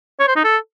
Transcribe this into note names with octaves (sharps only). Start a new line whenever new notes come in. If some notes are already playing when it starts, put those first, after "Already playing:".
C#5
C5
D#4
A4